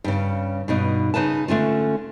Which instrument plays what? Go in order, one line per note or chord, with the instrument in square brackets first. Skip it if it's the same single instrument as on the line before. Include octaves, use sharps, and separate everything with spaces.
[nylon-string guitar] G2 C#3
G2 B2 D#4
C#3 D#4 B4 A5
D3 A3 C#4 F4